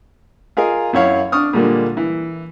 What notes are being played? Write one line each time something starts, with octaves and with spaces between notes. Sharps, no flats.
F4 G#4 A#4 D#5 F5
F#2 E4 C#5 F5
D4 C#6 D#6 F6
A#2 D3 G3 G#3 A#3
E3